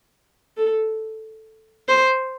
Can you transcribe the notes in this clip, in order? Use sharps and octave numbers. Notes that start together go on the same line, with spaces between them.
A4
C5